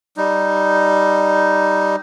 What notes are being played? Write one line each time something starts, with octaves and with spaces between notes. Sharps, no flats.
G3 D#4